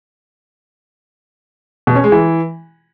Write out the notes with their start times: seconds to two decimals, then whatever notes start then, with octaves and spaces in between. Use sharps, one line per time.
1.87 B2
1.95 C#4
2.04 G#3
2.12 E3